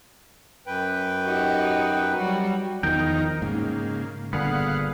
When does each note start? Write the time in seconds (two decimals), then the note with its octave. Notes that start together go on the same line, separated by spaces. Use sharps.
0.67 F#2 B4 G5
1.25 D#4 F#4 G4
2.16 F#3 G3 F#4
2.83 E2 D#3 F3 D#4 A#4 G5
3.42 G#2 C#3 A#3
4.33 G1 A#2 D3 B3 G#4 B4 F5 F#5